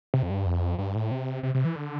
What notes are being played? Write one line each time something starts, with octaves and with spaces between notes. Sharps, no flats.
C3
F2
G2
F2
G2
A2
C3
C3
C3
E3
D3